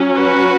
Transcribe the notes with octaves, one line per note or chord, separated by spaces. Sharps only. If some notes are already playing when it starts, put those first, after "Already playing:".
Already playing: F#3 C#4
F#4 B4